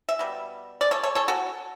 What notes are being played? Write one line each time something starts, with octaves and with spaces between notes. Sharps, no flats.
E5
B2 G3
D5
A4 C#5
A4 C#5
A4 C#5
F#4 A4